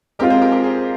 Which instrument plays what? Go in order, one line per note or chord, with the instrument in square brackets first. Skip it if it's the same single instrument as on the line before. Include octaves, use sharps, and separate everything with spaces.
[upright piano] G#3 C4 F4 [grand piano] G4 A#4
[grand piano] G#4 C5
G4 A#4
G4 A#4
G#4 C5